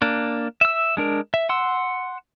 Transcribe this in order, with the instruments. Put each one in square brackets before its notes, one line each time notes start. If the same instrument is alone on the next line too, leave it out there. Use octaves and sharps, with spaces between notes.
[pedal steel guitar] A#3 D4
E5 E6
G#3 D4 A#4
E5
F#5 C6 E6